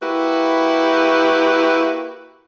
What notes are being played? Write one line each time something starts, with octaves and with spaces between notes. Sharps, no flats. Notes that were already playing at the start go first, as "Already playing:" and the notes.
A#3 E4 F#4 G4 B4